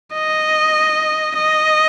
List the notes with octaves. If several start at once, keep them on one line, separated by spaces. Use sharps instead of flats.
D#5
D#5